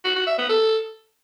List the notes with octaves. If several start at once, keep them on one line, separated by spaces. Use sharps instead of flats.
F#4
F#4
E5
B3
A4